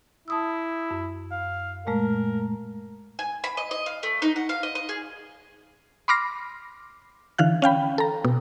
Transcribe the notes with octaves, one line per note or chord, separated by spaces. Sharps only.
E4 A5 D#6 E6
F#2
F5
A#2 G#3 A3 A#4
G#5
B5
D#5
D#5
F5
A3
D#4
F#5
F5
D#5
D#5
G#4
B5 C6 D6 F6 A#6 C7
D3 E3 F5 F#6
C#4 F5 G5 B5
A4 A#5
B2